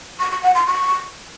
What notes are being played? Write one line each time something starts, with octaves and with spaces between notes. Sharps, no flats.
C#6
C#6
F#5
C6
C#6